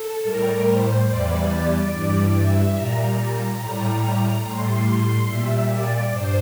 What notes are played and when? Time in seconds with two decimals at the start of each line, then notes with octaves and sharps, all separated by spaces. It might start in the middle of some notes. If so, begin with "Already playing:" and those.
Already playing: A4
0.23 A2 G3 A#4
0.65 C5
1.07 E2 E3 G3 D5
1.91 G2 E3 G3 D5
2.34 E5
2.75 A#2 G3 A#5
3.59 A2 G3
4.43 A2 G3 C6
4.85 C6
5.27 A#2 G3 E5
5.69 D5
6.11 G2 C5